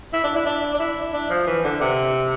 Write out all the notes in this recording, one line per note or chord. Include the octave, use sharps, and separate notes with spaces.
E4
D4
E4
D4
D4
E4
D4
F3
E3
D3
C3